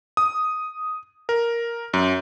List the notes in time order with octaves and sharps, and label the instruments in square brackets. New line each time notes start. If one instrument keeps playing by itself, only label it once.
[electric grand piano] D#6
A#4
F#2